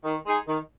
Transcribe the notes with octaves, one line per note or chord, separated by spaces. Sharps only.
D#3
G#3 D#4 G#4
D#3